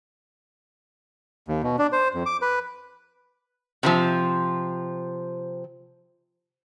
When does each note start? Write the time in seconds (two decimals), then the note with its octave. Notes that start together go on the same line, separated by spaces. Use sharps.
1.48 D#2
1.63 B2
1.79 D4
1.92 C5
2.14 F2
2.26 D6
2.42 B4
3.83 C3 E3 F3